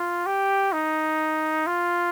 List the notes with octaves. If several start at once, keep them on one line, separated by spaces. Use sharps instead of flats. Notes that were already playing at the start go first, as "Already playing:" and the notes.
Already playing: F4
G4
D#4
F4